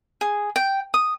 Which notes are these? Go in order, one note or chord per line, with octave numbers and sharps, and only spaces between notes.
G#4
G5
D#6